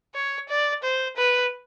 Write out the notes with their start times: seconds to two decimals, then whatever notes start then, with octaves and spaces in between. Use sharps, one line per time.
0.15 C#5
0.49 D5
0.83 C5
1.17 B4